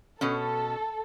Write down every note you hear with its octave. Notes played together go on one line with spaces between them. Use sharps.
B2 C#4 A4